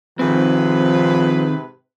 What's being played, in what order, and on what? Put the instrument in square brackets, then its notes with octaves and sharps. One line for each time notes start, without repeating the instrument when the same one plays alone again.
[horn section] G#2 C3 B4 [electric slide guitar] D#3 C4 [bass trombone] F3